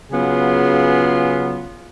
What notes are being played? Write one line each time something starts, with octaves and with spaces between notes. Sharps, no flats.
C#3 F#3 B3 F4 G#4